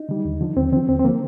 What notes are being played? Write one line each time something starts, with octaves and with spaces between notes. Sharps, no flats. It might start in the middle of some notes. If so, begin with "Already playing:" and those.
Already playing: D#4
D3 G3
D#2
D3 F3
D#2 C4
D3 F3 C4
D#2 C4
C4
D3 F3 A#3